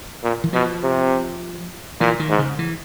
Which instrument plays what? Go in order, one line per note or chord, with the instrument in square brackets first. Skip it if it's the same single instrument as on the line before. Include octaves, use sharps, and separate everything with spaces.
[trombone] A#2
[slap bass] E3
[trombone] B2 [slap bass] F3
[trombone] C3
[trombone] A#2 [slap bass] E3
[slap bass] D#3
[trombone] G#2
[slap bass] C#3
E3